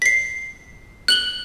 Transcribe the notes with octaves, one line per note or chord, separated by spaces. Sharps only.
B6 C7
F#6 F#7 G7